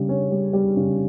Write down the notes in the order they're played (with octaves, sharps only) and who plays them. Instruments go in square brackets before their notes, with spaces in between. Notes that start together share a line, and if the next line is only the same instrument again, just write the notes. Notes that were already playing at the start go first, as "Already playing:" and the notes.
Already playing: [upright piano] C#3 G3
C#4
G3
G3
C#3